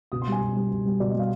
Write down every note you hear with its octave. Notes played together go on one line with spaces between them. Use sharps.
B2 D#6
C6
G3 G#5
B2
G3
B2
G3
B2 D5
D#5
G3 F5